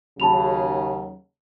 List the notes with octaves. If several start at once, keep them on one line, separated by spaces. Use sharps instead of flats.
D#2 C#3 F#3 A5 B5 F7